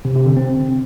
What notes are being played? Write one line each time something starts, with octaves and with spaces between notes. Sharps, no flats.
C3
C3
D3
C4